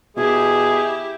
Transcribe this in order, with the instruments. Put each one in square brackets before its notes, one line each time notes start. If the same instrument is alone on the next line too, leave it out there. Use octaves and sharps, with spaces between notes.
[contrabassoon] B2 [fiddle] E4 G4 [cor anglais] G#4